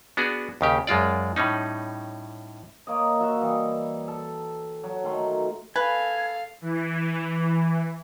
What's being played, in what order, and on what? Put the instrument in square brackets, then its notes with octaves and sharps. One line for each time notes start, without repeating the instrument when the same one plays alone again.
[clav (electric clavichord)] B3 D4 F#4 G#4
D#2 C#3 G4
F#2 G#3 F4 D5
A2 G3 C#4 D#4
[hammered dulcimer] A#3 C#5 D#5
F4 F#4 E5
E3 G3 D#5
A4
F#3
D#3 F#3 A3 C6
[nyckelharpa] A4 F5 [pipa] B4 [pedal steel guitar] G#5
[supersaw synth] E3